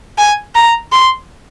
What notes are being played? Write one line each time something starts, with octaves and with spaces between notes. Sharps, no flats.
G#5
A#5
C6